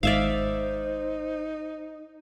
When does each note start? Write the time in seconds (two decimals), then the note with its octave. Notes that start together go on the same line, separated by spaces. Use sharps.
0.03 G#1 G#2 D#4 C5 D5 E5 F5